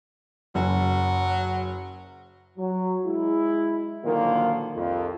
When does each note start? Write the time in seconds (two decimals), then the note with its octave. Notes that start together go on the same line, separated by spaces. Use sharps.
0.55 F#1 F#3
2.57 F#3
3.05 G#3 E4
4.04 A#2 D3 D#3 F3 F#3 A#3
4.74 C2 F2